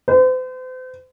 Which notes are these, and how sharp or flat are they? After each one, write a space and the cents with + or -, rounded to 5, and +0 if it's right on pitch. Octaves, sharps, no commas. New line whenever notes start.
C5 -40